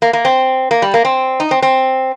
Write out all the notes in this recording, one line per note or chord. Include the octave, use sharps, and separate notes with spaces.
A#3
A#3
C4
A#3
G3
A#3
C4
D#4
C4
C4